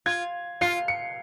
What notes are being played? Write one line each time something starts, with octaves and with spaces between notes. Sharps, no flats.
F4 G#6
F4 C7
C#7